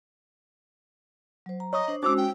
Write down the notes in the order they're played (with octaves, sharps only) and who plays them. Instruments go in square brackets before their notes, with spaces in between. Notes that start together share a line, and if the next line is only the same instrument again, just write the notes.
[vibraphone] F#3 C5
A#5
[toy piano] C#5 C#6 D#6 [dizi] D#5
[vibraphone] D4 C5
[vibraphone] G#3 C#4 F#4 [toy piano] D#4 C5 E6 [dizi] D6
[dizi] G5